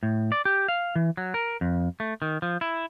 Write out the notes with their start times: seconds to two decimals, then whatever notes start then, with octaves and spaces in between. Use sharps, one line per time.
0.03 A2
0.32 D5
0.45 G4
0.68 F5
0.96 E3
1.17 F#3
1.34 A#4
1.61 F2
2.00 A3
2.22 D#3
2.42 F3
2.61 E4